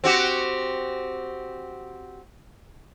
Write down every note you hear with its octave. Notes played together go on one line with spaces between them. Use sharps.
C4 F#4 G4